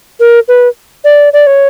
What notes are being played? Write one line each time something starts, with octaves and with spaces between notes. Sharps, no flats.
A#4
B4
D5
D5
C#5